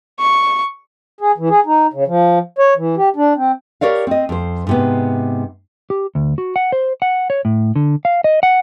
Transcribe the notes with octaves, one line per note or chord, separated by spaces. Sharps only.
C#6
G#4
E3
G#4
D#4
C#3
F3
C#5
E3
G4
D4
C4
G4 A#4 C#5 D5 F5
C4 D#5
F2 C5
G#2 C3 B3
G4
D2
F#4
F#5
C5
F#5
C#5
A2
D3
F5
D#5
F#5